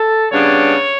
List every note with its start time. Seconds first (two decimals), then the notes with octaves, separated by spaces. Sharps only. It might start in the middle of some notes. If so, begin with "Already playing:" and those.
Already playing: A4
0.31 C#3 G3 B3 D4 C#5